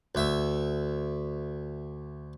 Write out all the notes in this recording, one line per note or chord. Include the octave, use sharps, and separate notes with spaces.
D2 E5